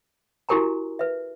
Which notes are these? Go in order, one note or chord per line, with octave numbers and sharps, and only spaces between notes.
E4 F#4 G4 A#4 G#5 A#5
B4 E5